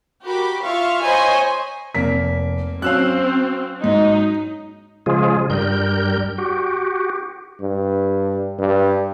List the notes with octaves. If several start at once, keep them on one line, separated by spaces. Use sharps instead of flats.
F#4 G4 A#4 B5 D6
F4 E5 F5 C#6 F6
C5 C#5 D#5 G#5 B5 C#6
F1 A#3 B6
F#3 C4 C#4 F5 E6 F#6
G#2 D#4
C#3 F3 G#3 F4 G#4
G2 G3 A#4 G6
F#4 G4
G2
G2